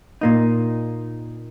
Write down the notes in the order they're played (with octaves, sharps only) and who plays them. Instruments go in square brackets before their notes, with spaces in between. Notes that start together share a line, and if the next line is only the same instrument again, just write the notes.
[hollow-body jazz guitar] A#2 A#3 D#4